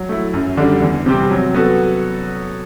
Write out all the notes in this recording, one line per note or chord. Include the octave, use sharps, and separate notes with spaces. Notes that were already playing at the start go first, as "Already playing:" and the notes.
Already playing: F#3
A3 E4
F#2
D3 G3 D4
E2
C3 G3 C4 G4
F#3
B3 F#4 A4